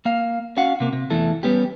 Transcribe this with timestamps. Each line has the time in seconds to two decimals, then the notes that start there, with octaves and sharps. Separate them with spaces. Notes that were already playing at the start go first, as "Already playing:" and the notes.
0.05 A#3 F5
0.57 C#4 F#4 F5 F#5
0.80 C3 A#3
0.93 C3
1.10 E2 E3 A3 E4 A4
1.43 G3 B3 C#4 G4